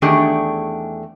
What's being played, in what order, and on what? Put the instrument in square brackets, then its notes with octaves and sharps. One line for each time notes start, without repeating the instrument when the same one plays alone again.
[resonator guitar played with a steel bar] E2 D#3 A3 D4 G4 G#4